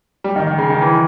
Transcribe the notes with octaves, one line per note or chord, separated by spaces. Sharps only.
G3
D#3
D#3
C#3
D#3
E3